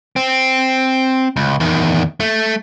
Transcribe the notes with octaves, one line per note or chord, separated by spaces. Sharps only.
C4
C#2
E2 D#3
A3